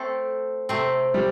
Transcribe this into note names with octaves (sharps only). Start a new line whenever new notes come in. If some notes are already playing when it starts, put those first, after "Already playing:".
Already playing: A3 C4 A4
C3 A3 C4
G3